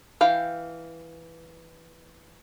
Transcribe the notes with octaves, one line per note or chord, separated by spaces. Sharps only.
E3 F5 G5